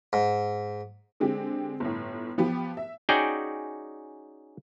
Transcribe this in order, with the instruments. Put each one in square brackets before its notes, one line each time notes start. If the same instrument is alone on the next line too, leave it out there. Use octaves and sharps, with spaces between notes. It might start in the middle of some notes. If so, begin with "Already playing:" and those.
[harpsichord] G#2
[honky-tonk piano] D3 G#3 C4 G4
G1 A2
F3 B3 G4
E5
[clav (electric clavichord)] C#4 D#4 F#4 G#4 D5 G5